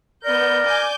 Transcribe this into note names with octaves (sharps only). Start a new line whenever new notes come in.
B3 A#4 D5 G6
G#5 D6 G6